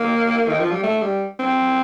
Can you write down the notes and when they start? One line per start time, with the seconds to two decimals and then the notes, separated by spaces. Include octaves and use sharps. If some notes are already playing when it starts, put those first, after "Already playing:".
Already playing: A#3
0.49 D#3
0.60 F3
0.72 G3
0.83 A3
1.02 G3
1.39 C4